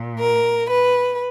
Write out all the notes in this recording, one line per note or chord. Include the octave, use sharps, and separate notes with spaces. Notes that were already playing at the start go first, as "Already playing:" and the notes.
Already playing: A#2
A#4
B4